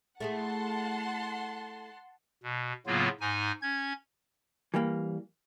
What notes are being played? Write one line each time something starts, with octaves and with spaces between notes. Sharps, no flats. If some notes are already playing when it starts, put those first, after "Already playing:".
A3 E4 G#4 F#5 A5 C6
B2
A2 C#3 F#3 A#3 B3 F4
G#2 D#4 G#5
C#4 G#6
E3 G3 A#3